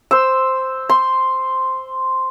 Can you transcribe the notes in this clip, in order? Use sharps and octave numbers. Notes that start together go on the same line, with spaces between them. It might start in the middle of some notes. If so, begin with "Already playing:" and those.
C5 E6
C6